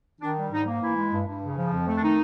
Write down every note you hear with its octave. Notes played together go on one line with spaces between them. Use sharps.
D#3 D4
G3
G#2 D#4
A#3
E3 E4
G#3
G2
G2
C#3
F3
F2
A3
D4
D#3 D#4